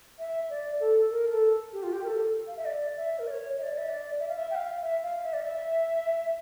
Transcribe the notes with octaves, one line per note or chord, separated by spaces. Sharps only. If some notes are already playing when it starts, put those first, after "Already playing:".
E5
D5
A4
A#4
A4
G4
F4
G4
A#4
A4
F5
E5
D5
E5
A#4
D5
C#5
E5
D5
E5
D5
E5
F5
E5
G5
F5
E5
F5
E5
D5
E5